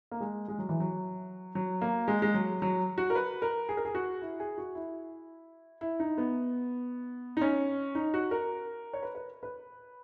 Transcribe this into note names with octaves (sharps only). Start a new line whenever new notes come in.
A#3
G#3
G#3
F#3
E3
F#3
F#3
A#3
G#3
G#3
F#3
F#3
F#4
A#4
B4
A#4
G#4
A#4
G#4
F#4
E4
G#4
F#4
E4
E4
D#4
B3
D#4
C#4
D#4
F#4
A#4
C#5
B4
B4
B4